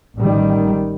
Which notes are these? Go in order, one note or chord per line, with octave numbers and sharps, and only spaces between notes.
A1 D#3 G3